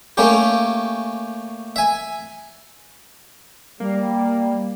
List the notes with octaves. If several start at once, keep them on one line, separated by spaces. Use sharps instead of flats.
A3 A#3 C#4 G4
E5 G#5
G3 A#3